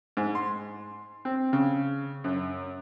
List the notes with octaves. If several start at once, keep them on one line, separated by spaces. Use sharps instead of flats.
G#2
C6
C4
C#3
F#2